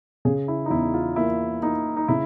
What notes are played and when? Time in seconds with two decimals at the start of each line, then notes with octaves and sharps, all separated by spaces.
0.25 C#3 G#4
0.48 E4
0.66 D#4
0.70 E2 E4
0.94 F4
1.16 A#3 E4
1.62 A#3 D#4
1.97 D#4
2.08 C#3 E4